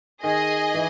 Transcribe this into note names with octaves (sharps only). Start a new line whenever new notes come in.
D#3 G#4 D#5 G#5
E3